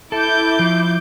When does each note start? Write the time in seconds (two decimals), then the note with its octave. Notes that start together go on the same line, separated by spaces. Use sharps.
0.12 E4 A4 D6 G6
0.59 F3